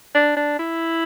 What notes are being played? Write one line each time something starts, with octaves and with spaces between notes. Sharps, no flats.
D4
D4
E4